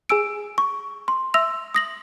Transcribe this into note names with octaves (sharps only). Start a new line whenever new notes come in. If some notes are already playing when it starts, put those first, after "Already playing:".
G#4 G#5 E6 D7
C#6
C6
E5 C6 E6 A#6 F7
D#6 A#6 F#7